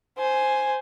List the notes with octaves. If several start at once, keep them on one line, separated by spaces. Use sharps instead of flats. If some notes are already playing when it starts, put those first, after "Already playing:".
C5 G#5